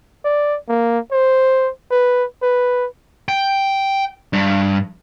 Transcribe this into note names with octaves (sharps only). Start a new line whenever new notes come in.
D5
A#3
C5
B4
B4
G5
G2